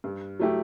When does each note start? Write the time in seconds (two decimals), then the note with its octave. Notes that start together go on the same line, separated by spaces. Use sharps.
0.04 G2
0.39 F#3 A3 E4 G4